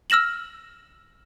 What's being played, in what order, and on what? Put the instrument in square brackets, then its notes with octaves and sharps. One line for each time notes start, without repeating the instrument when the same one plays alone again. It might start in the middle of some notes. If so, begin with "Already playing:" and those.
[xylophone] E6 F6 A#6 E7 F#7